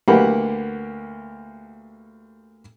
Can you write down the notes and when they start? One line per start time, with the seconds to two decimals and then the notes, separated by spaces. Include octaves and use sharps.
0.08 D2 A#3 G4 B4 F#5 B5